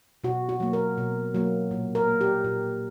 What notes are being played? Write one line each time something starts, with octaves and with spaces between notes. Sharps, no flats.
B2 F#4
F#4
F#3 A#3
A#4
B2
F#3 A#3
A#2
A#4
A#3
G4
A#2